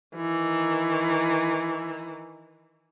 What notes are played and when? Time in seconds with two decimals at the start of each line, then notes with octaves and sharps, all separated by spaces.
0.16 D#3 E3